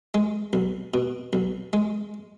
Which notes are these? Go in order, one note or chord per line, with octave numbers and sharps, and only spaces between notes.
G#3
B1
B2
B1
G#3